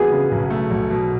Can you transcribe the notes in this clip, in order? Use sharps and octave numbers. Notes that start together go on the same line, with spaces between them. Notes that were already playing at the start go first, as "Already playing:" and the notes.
Already playing: B3 F#4 G#4
C#3
B1
A3
B1
B2